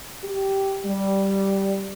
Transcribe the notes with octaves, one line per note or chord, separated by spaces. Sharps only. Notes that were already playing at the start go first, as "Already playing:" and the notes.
G4
G3